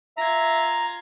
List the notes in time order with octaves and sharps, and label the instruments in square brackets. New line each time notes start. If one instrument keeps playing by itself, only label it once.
[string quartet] F4 G#6 [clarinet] E5 [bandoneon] A#5